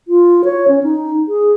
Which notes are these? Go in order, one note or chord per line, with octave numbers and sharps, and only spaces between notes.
F4
C#5
C#4
D#4
G#4